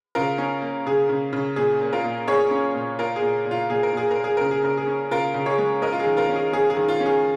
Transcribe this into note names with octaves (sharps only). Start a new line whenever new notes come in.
C#3 F4 A#4
C#4
A#3
C#3 G#4
C#3
C#3
A#2 G#4
A#3
F4 A#4
A#2
C#4 G#4 C#5
C#4
A#2
A#3 F4 A#4
G#4
A#2
A#2
F4
A#2 G#4
A#4
A#2 G#4
A#4
A#3
G#4
C#3 A#4
G#4
C#3 A#4
G#4
C#4
C#3 F4 A#4
C#3
G#4 C#5
G#3
C#4 A#4 D#5
F4
G#4
D#3
F4 A#4
C#4
G#4
C#4 G#4
G#4
D#3
F4
C#4
G#4